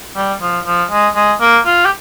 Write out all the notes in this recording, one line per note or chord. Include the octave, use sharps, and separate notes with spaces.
G3
F3
F3
G#3
G#3
A#3
F4
G4